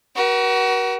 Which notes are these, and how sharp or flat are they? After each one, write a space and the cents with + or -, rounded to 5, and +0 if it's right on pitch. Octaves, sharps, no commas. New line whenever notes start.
F#4 +30 A#4 +45